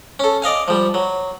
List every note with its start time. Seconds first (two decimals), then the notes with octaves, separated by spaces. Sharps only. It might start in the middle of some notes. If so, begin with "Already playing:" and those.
0.19 C#4 A4
0.42 D5 D#5 F5 G#5
0.68 F3 G3
0.94 F#3